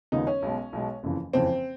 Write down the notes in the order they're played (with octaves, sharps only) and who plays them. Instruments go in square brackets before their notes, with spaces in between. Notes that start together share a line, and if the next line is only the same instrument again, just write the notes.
[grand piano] D#2 C#3 F3 G#3 B3 [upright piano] D#4
[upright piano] C#4
[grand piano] B1 B2 G#3
B1 B2 G#3
F#1 F2 C#3 E3
[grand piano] F#1 F2 C#3 E3 [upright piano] C4